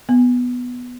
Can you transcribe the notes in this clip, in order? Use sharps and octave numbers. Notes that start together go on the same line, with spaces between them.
B3